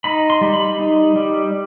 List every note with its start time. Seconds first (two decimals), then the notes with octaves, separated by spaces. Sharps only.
0.04 D#4 B5
0.30 C6
0.41 G3
0.53 B5
0.79 D#4
1.16 G3